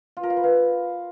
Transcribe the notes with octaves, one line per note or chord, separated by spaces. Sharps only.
F4
A#4
F5
B4
F5